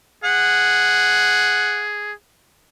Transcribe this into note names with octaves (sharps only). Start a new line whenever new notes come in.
G#4 F#5